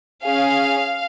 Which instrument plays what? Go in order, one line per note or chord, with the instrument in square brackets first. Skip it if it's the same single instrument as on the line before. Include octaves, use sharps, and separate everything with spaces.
[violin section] C#4 G#4 F5